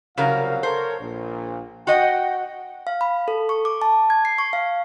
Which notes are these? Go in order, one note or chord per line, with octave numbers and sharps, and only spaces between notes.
C2 C#3 F#3 A#4 F5
A4 A#4 C5 C#5
A#1 A#2
F#4 D#5 F#5 G5
F5
B5
A4
C#6
D6
A5
G#6
C7
C#6
F5